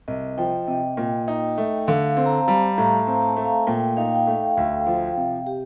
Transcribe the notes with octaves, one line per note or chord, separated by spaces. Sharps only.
C2 D#5
F3 G5
C3 D#5
A#2
D#4
A3
D3 F5
C4
A#5
A5
G3
A2 A#5
A5
C4
A5
A3
F5
A#2 G5
D#4 F5
G5
A3 F5
D2 F5
F3
C3
G4